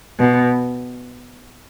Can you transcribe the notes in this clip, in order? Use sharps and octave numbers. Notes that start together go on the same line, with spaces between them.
B2